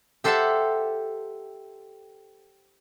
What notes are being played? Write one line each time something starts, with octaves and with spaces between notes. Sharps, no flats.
G4 A4 C5 E5 F#5 A5